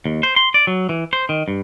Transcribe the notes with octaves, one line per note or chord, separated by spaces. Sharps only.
D#2
C5
C6
D5
F#3
E3
C5
D#3
G2